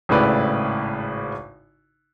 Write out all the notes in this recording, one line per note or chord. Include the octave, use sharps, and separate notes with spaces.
G#1 A2 C#3 E4 B4 D5